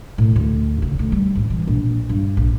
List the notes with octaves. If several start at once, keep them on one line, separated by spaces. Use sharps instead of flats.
A2
D2
C#3
D2
G3
A1
E3
A#1
G2
A#1